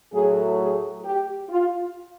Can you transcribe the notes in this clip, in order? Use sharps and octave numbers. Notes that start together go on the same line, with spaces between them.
A2 F#3 A3 G#4
G#4
G4
F4